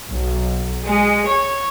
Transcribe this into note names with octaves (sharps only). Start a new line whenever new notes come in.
B1
G#3
C#5